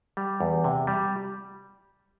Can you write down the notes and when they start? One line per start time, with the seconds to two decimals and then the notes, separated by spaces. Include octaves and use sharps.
0.17 G3
0.40 E2
0.64 C3
0.87 G3